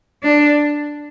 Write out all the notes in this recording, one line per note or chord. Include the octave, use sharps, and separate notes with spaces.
D4